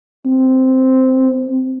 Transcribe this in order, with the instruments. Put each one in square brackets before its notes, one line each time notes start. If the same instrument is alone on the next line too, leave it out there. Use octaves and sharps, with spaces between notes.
[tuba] C4